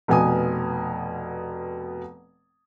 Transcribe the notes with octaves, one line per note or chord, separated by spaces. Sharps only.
F1 B2 G#5 D#6